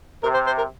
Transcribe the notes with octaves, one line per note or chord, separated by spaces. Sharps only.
C3 A#4
C5
C5
A#4